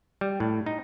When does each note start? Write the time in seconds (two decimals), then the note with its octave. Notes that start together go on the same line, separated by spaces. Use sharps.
0.21 G3
0.40 A2
0.66 D#4